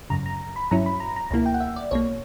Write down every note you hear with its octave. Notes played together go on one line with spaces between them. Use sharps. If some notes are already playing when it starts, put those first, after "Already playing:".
G1 F#2 C#3 A#5
A#5
B5
G2 F#3 C#4 E4 A#5
B5
A#5
A#5
C#2 B2 A#3 E4 A#5
G5
F#5
E5
D5
B1 B2 A#3 C#5